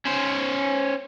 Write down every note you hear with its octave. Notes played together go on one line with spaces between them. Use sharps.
C#4 C5